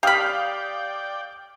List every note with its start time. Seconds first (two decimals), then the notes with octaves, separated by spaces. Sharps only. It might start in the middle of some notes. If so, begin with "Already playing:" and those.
0.03 G4 D5 F5 G5 B5 D#6 F6